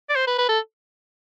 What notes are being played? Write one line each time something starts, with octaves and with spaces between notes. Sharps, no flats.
D5
C5
B4
B4
A4